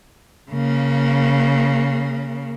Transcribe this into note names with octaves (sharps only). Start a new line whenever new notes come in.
C#3 A#3